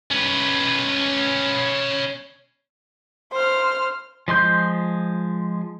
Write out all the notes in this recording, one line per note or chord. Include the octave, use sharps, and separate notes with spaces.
C#4 B4
C5 F6
F3 G#3 C6 G6